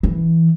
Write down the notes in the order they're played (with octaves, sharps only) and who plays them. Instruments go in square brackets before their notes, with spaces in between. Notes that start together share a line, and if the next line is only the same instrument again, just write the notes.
[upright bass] E3